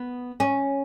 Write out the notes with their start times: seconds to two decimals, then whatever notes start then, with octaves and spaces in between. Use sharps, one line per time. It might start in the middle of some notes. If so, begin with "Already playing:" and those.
Already playing: B3
0.40 C#4